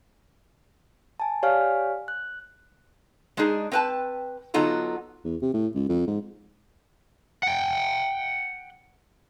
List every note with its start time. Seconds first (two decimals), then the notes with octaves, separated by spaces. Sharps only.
1.20 G#5 A5
1.43 G4 C#5 D5 F5 G#5 F6
2.08 F#6
3.37 G#3 D4 D#4 G#4
3.72 C4 D4 B4 G5 A5
4.54 D3 F#3 B3 D#4 F4 A4
5.25 E2
5.42 C3
5.54 A2
5.75 C#2
5.89 F2
6.07 G#2
7.43 F#5 G5